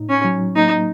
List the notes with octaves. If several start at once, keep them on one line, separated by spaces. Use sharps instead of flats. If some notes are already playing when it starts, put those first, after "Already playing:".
Already playing: A2 D#4
C#4
F#3
A#3 D#4